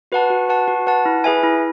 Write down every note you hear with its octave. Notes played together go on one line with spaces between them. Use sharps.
F#4 B4 F#5 A5
F#4
B4 F#5 A5
F#4
B4 F#5 A5
E4
G#4 B4 E5 G#5
E4